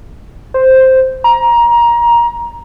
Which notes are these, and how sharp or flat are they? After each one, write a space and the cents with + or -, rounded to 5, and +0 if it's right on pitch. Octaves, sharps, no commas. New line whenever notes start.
C5 +0
A#5 +20